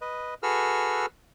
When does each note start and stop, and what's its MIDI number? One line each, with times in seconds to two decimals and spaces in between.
0.01 0.34 71
0.01 0.34 75
0.43 1.06 66
0.43 1.06 68
0.43 1.06 69
0.43 1.06 71
0.43 1.06 88
0.43 1.06 89